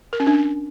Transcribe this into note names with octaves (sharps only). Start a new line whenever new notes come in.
A#4
C#4
D4